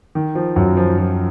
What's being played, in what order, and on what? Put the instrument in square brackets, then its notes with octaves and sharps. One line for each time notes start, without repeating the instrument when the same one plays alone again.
[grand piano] D#3
F3
F#2 F#3
F3
F3